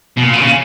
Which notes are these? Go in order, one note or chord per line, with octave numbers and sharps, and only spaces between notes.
B2
A#2
B2
C#3